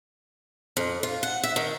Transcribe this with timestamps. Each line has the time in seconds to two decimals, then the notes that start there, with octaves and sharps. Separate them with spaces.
0.77 F2
1.03 F4
1.23 F#5
1.43 E5
1.56 D#3